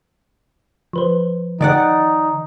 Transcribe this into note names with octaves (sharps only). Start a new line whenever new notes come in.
F3 B4 C5
D#3 D#4 D5 F#5